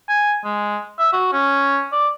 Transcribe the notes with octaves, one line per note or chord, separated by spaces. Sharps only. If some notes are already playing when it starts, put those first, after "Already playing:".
G#5
G#3
E5
F#4
C#4
D5